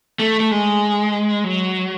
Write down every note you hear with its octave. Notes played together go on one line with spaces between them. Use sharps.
A3
A3
G#3
F#3